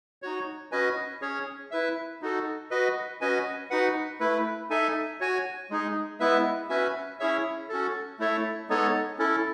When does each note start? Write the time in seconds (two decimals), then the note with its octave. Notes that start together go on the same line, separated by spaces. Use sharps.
0.22 D#4 F#4 C#5
0.72 C#4 F#4 B4 D#5 G#5
1.21 C#4 G#4 C#5
1.71 E4 B4 E5
2.22 D#4 F#4 A4
2.71 F#4 B4 D#5
3.21 C#4 F#4 B4 D#5 G#5
3.70 D#4 F#4 B4 F#5
4.20 A3 E4 B4
4.70 D#4 A4 E5 G#5
5.20 F#4 C#5 G#5
5.70 G#3 D#4 G#4
6.20 G#3 B3 E4 B4 E5
6.69 C#4 F#4 B4 E5 G#5
7.19 C#4 E4 G#4 C#5 E5
7.69 C#4 F#4 A4
8.19 A3 E4 A4 C#5 E5
8.69 G#3 B3 D#4 A4 C#5
9.19 C#4 E4 A4